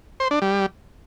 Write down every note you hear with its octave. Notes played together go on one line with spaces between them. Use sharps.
C5
D4
G3